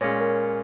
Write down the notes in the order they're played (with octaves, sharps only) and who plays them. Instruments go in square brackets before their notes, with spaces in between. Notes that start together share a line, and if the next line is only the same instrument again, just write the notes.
[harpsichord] A#2 G#3 C#4 [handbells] C#5
[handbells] A#4